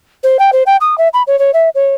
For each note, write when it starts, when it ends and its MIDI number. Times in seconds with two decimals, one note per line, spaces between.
0.24 0.37 72
0.39 0.51 79
0.53 0.63 72
0.66 0.77 79
0.81 0.98 87
0.98 1.08 76
1.14 1.22 83
1.27 1.38 73
1.39 1.51 73
1.54 1.69 76
1.75 1.95 73